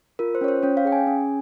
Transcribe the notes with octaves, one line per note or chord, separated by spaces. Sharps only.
F4 A#4
C5
C#4 C#5
C5
C#4 C#5
F5
G#4 G5
G#5
C#4